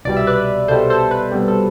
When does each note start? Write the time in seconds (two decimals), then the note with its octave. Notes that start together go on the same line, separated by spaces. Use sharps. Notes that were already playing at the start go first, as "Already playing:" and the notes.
0.05 C2 B2 G3 D5
0.17 E5
0.27 B4 D5
0.68 C2 B2 G3 A4 C5
0.90 A4 C5
1.11 B4
1.32 C2 B2 G3
1.48 A4